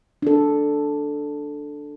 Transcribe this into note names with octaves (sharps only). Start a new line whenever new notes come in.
D4 A4